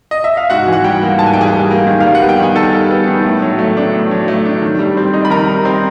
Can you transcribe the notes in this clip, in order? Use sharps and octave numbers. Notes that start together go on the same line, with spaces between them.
D#5
E5
F5
G#2 F#4 F#5
E3
F#5
G3 G4 G5
A#3
G#2 A5
G#5
E3 G5
G#4 G#5
G3
A#3
D#3
G3 F5
F#5
B3
G5
D#3 G#5
D#3 A4 A5
G3
B3
D#3
A2
F#3
A3
D4
A2
F#3
A3
D4
D#3
G3
C4
D#4
B5
D#3 A#4 A#5
G3
C4